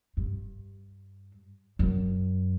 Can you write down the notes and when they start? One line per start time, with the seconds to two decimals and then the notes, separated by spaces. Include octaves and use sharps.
0.17 G2
1.79 F#2